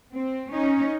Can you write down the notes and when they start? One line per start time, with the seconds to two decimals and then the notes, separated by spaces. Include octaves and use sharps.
0.13 C4
0.51 C#4 D#4